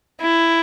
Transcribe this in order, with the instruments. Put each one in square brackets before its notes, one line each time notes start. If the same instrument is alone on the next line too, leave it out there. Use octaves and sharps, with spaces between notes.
[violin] E4